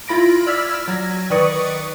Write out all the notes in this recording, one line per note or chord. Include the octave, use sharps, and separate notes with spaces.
E4 F4 B5 A#6 D7
D5 E6 F6 G#6 B6
F#3 G#6 A#6
D#3 B4 D5 C#6 D#6 C#7